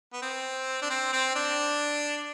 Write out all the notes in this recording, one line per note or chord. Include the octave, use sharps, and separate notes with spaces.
B3
C4
D4
C4
C4
D4